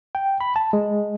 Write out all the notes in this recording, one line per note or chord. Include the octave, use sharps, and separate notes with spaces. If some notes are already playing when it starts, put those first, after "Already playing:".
G5
B5
A5
G#3